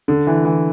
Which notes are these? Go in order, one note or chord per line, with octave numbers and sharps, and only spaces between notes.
D3
E3
E3